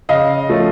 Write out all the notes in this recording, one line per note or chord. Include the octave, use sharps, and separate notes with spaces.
C#3 D#5 F5
F3 A3 C#4